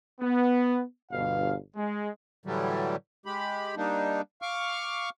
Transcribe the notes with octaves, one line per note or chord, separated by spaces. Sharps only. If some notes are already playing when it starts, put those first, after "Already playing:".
B3
G1 B2 F5
G#3
A2 D3 E3 F#3 G3
G#3 G4 B5
G3 A#3 D4 D#4
F5 C#6 D6 F6